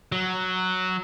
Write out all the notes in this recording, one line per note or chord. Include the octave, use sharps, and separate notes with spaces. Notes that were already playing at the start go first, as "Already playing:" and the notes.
F#3